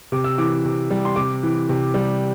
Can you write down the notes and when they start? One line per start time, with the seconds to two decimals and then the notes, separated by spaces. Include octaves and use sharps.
0.12 C3 D6
0.24 E6
0.38 E3 D6
0.65 C3
0.90 G3
1.05 C6
1.16 C3 D6
1.43 E3
1.69 C3
1.94 G3